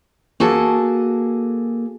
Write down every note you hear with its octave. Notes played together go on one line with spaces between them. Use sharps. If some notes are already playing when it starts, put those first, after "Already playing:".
A#3 F#4 G#4 A4 A5